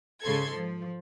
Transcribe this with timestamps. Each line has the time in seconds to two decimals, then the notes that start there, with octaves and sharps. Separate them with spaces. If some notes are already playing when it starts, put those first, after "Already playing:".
0.22 G#2 C#3 A4 C6 G#6
0.53 F3